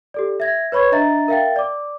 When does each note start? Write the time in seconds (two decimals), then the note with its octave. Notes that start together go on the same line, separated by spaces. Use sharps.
0.14 G4 A4 D5
0.40 E5 G#6 A#6
0.72 B4 C#5 B5 C#6 G#6
0.92 D4 D#5 E5 A#5 A6
1.28 A#4 E5 F5 G5 A6
1.56 D5 D6